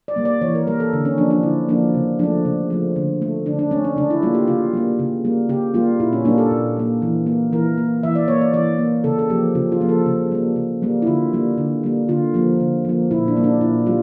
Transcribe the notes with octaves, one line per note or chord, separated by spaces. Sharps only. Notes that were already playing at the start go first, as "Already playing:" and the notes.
D5
G3 A#3
D5
E3 C#5
A#4
G3 A#3 A#4
A4
D3
C#4
F3 A#3 D4
D4
D3 E4
F3 A#3 D4
C#3
F3 A3 D4
C#3
F3 A3
D3
A3
D3 D4
D4
A3 C#4
D4
C#3 D4
E4
G3 A#3 F4
G4
C#3 F4
G3 A#3
C#3
G3 A#3
C#3 G4
G3 A#3 F4
A#2 E4
C#4
G3 A#3 D4
A4
A#2
G3 A#3
E3
A#3
E3 A#4
A#3
E3 E5
D5
A#3 C#5
D5
E3 D5
A#3
C#3 A4
A4
F3 A#3 G4
C#3 F4
F4
F3 A#3
A4
C#3
G3 A#3
C#3
G3 A#3
E4
D3 F4
G3 A#3
D3
G3 A#3
D3 F4
F3 A#3
D3
F3 A#3
A#2 E4
D4
G3 A#3
D4
A#2 E4
G3 F4